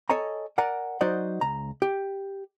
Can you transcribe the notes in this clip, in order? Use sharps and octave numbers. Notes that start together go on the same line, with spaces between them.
A4 C#5 D#5 G#5 A#5
A#4 D5 F#5 G#5 A#5
F#3 D#4 F#4 C5 D5 D#5
C#2 A#5
G4